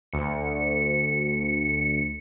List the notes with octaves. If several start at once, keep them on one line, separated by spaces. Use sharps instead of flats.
D2 C#7